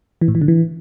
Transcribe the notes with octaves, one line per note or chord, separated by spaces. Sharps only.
E3
A2
E3
D3
E3